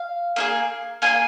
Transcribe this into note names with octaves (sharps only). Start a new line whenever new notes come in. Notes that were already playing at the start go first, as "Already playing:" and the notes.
Already playing: F5
A#3 D#4 G#4
A#3 F4 G#4 G#5